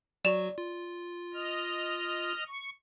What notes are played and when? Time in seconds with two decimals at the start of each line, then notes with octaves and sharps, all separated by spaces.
0.25 F#3 F#4 D5 C#6 E7 F7
0.58 F4
1.34 D#5 F6
2.48 C#6